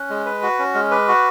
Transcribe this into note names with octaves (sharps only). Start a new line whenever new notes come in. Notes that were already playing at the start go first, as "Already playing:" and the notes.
Already playing: C#4 F#6
G#3
B4
F#4
C#4
G#3 F6
B4 D6
F#4 C#6